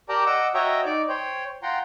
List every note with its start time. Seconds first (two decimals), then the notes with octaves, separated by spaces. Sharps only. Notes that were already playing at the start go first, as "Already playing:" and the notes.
0.09 G4 A#4 D5 G5 A5 A#5
0.26 D#5 F#5 D6 E6
0.54 F#4 C#5 D#5 E5 G5 A#5
0.85 D#4 D5 D6
1.09 C5 C#5 G5
1.63 F4 F#5 G5 A#5 C6